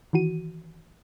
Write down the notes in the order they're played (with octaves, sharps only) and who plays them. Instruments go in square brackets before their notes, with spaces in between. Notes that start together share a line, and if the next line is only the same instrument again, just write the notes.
[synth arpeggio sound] D#3 E3 F#4 D#7